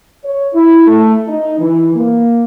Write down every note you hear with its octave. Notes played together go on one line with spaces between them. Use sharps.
C#5
E4
A3
D#4
E3
A#3